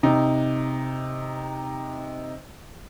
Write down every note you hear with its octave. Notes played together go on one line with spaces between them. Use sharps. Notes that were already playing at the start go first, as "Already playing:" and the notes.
C3 D#4